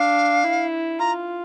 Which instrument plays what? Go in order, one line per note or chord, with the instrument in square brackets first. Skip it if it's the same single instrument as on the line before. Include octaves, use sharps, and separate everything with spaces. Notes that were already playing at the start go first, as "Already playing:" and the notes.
Already playing: [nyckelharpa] D4 [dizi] F5
[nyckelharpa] E4
[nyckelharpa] F4 [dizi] A#5